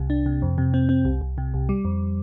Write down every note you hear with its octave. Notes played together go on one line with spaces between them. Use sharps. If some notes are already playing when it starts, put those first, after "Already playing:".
Already playing: C2 C3
D4
C3
F2
C3
C4
C4
C2
C2
C3
C2
G3
F2